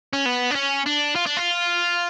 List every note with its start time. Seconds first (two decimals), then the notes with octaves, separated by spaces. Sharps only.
0.13 C#4
0.26 B3
0.51 D4
0.55 C#4
0.86 D4
1.16 F4
1.26 D4
1.37 F4